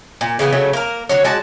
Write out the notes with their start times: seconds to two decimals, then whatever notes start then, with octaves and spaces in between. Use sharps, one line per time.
0.21 A#2
0.39 C#3 E3 A3 B3
0.52 C#3 F#3 A3
0.73 A#3 A#4
1.09 D3 F#3 C#5
1.24 G#3 F#4 D5 A5